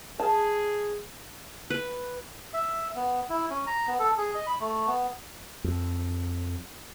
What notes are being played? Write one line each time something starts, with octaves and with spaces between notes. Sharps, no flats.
G#4 A5
B4
E5
B3
E4
C#4
A#5
B3
A4
G#4
D#5
B5
A3
B3
F2